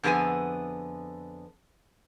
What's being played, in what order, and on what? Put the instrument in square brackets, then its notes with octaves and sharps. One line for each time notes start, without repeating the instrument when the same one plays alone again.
[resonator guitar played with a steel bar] F2 D3 B3 G#4 E5 G#5